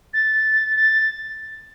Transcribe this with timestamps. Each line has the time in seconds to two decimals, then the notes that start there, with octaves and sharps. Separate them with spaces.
0.14 A6
0.76 A6